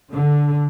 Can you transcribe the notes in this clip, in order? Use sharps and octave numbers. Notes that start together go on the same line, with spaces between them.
D3